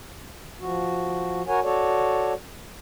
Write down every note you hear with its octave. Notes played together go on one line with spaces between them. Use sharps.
F3 F#4
F#4 A#4 C#5 F#5 G#5
F#4 A4 C#5 D5